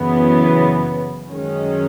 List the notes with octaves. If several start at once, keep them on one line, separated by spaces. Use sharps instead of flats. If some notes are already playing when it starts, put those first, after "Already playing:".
Already playing: F#2 C#3 E3 B3
F#2 D#3 G#3 C#4